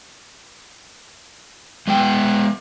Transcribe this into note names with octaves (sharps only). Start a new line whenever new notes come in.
G#3 B3 G5